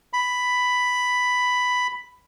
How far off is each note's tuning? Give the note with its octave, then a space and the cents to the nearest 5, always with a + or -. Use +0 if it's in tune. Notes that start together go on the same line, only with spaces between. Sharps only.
B5 +5